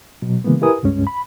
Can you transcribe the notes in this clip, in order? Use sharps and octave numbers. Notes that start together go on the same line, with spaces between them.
B2 F#3
C#3 E3 G#3 A#3 B3
E4 G4 A#4 B4 G#5 D#6
C#2 G2 G#3 C#4
B5